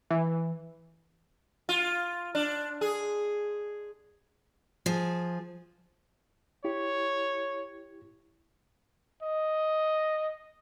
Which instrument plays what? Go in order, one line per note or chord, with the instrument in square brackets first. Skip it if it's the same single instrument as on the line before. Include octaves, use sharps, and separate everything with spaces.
[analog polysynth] E3
[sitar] F4
D4
G#4
[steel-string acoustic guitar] F3 G#4
[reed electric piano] E4 G4 [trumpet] C#5
[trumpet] D#5